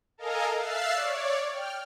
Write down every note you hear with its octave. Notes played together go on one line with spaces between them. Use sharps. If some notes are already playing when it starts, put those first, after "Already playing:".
A4 A#4 D#5 F5 G#5 A#5
E5 F5 E6 F#6 A6 C7
C#5 D5
G5 F6